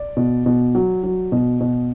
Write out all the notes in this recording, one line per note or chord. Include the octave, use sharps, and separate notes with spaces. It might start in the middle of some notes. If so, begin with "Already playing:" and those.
Already playing: D5
B2
B2
F#3
F#3
B2
B2